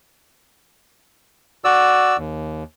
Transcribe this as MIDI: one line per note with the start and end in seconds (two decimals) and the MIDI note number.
1.65 2.17 66
1.65 2.17 74
1.65 2.17 88
2.17 2.63 39